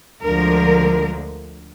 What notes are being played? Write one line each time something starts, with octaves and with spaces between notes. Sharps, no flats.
D2 D3 F3 G#3 A#4